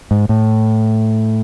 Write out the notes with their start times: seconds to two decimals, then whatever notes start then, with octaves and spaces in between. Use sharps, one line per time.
0.11 G#2
0.29 A2